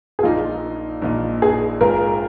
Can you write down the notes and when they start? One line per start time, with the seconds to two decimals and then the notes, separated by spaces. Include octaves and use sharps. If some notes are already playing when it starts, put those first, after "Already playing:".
0.19 G#4
0.23 A#1 A#2 A#3 D#4 F4
1.02 A#1 A#2 A#3 D#4
1.42 G#4
1.81 G#1 G#2 G#3 F4 A#4